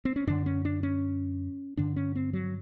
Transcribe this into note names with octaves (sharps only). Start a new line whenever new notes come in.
C4
C#4
F#2 D3 D4
C#4
D4
C#4
G2 D3 D4
C#4
C4
F#3